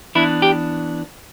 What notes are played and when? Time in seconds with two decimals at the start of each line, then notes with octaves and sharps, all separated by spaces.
0.15 E3 B3 D4 E4
0.42 G4